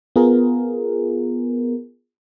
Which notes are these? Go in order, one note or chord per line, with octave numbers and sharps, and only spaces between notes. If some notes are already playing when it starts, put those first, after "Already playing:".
B3 F4 G#4 A#4